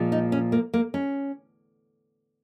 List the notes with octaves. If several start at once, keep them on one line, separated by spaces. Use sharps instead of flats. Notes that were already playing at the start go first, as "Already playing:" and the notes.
Already playing: A#2 F3 G#3
D#4
C#4
A#3
A#3
C#4